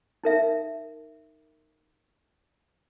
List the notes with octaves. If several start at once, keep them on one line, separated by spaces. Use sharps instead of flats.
D#4 A#4 E5